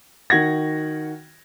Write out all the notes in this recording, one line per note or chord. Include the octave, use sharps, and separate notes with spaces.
D#3 F#4 F#5 G#6 A#6